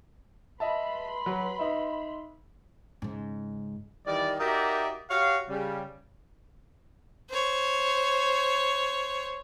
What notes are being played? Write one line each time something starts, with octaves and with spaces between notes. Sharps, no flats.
B4 D#5 E5 A5 B5 C6
F#3
D#4 E5
G#2 C#3
D#3 E3 G3 D5
D#4 F#4 G4 A#4 D5 E5
F#4 G4 C#5 F5
C#3 G3
C5 C#5